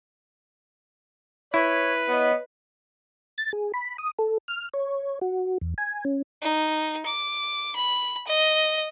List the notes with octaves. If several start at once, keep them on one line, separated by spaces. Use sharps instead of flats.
E4 B4 C#5
B3 C#5 D#5
A6
G#4
B5
D#6
A4
F6
C#5
F#4
E2
G#5
C#4
D#4
D6
B5
D#5